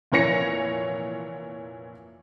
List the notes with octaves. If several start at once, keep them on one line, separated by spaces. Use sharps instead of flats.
F1 A#2 E3 C#5 A#6 C#7